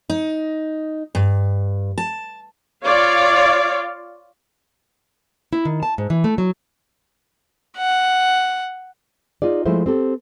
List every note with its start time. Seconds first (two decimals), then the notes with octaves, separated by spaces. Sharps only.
0.10 D#4
1.15 G2
1.98 A5
2.85 F4 C#5 D5 F5
5.53 E4
5.65 D#3
5.83 A5
5.98 G#2
6.10 E3
6.24 A3
6.38 F#3
7.78 F#5
9.42 D#4 F4 G#4 D5
9.66 F3 G#3 A3 E4 C5
9.86 C4 G4 A4